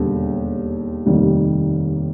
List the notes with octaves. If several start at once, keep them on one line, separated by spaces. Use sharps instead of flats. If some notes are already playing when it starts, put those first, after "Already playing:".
Already playing: E1 D#2 D3 G3
F1 D#2 D#3 G3